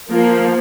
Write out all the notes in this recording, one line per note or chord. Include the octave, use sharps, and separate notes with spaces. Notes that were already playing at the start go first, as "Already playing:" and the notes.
F3 A#3 F4